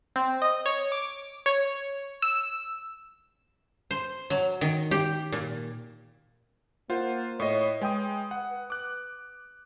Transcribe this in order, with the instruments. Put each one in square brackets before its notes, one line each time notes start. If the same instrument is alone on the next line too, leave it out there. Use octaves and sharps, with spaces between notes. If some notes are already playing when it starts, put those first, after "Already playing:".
[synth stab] C4
D#5
C#5
D6
C#5
E6
[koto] C5
F#3
D#3
G4
A#2
[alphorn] A#3 [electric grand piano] F4 C5 F#5
[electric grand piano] A2 D#5 [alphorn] C#5
[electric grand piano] G#3 G5 D#6 [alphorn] B4
[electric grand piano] F#5
D6 F#6